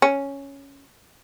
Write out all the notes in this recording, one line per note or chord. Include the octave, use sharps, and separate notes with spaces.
C#4